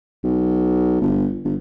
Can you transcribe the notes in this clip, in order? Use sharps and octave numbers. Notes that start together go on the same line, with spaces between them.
B1
G1
G1